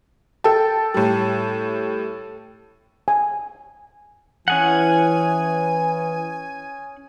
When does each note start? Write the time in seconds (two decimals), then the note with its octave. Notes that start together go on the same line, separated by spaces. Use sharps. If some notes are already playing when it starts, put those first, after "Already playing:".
0.44 A4 G5 A5
0.94 A2 G3
3.08 G#5
4.48 E3 C#4 G#4 F#5 G#5